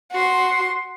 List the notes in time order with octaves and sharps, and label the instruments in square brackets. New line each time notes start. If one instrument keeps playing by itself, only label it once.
[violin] F#4 C6